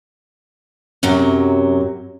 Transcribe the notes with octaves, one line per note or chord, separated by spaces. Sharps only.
F#2 C3 F#3